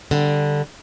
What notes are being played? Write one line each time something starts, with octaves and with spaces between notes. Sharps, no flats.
D3 G3